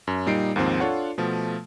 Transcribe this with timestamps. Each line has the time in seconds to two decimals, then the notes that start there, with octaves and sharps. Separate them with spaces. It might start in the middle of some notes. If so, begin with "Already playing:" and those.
0.07 F#2
0.26 A#2 G3 D#4 C7 D7
0.56 D#2 G#2 F3 C4
0.80 D4 F4 A4 C#5 F#5
1.18 B2 F3 A3